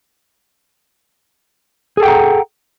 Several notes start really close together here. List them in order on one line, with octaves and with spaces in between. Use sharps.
G#4 A4 G5 F#5 A#5